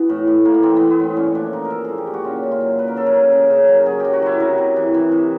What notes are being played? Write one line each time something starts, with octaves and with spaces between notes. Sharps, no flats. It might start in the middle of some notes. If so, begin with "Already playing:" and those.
Already playing: E3 B3
A2
A2
E3 A#3
B3
E3 C4
E3 B3
B3
A2 C4
A#2 C#4
F3 D4
F3 D#4
A#4
F3 A4
A#2 G#4
G4
A#2
F#4
C#3 F4
C#3
F4
F#3
F#3 B4
A#4
F#3 A4
A#4
C#3
C#3
C#3
F#3
F#3 G#4
F#3 G4
F#4
F#3 E4
C3 D#4
C3
E3
E3
C3